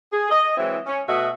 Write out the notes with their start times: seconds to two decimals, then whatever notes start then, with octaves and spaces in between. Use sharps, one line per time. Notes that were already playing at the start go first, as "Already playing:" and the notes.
0.12 G#4
0.30 D#5
0.57 E3 F#3 G#3 C4 E4
0.86 C#4
1.08 B2 A3 F#4 D#5 E5